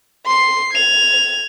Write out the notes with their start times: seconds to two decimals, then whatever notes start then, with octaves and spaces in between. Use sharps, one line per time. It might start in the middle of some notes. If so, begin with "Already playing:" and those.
0.25 C6 C7
0.74 G#6 F7